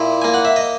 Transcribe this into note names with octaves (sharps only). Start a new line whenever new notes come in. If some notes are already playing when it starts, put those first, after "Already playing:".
Already playing: A#2 E4
A#3 G#5
F#5
E5
D#5